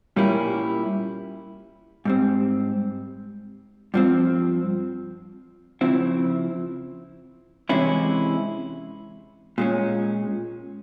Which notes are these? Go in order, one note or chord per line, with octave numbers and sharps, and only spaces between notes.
A#2 G3 A#3 C#4 E4
G#2 G3 C4
G2 F3 C4
C#3 F3 C4 E4
C3 E3 G#3 C#4 E4
A#2 G#3 C#4